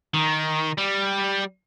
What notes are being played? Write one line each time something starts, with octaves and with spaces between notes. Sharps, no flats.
D#3
G3